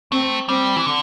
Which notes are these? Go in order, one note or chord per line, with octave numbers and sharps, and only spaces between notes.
A3 C4
G3 C4
E3
D3